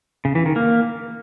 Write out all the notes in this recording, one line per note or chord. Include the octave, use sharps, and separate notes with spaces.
C#3
E3
D#3
A#3